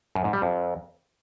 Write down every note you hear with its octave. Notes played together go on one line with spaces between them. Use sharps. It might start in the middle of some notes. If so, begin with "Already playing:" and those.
F#2
G#2
G3
F2